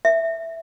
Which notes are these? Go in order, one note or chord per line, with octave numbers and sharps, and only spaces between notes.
E5